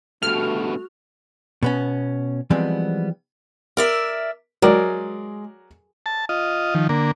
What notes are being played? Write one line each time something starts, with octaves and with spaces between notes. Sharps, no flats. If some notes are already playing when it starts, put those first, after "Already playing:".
G2 B2 A3 F#4 F6
B2 B3 C#4
E3 F3 G3 G#3 B3 C4
A#4 D5 E5
F#3 G#3 A#4 D5
A5
F4 D#5
D#3 F3
D3 A#3